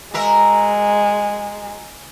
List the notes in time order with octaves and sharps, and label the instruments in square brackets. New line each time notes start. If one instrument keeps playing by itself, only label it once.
[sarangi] G#3 [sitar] F#4 A#4 E5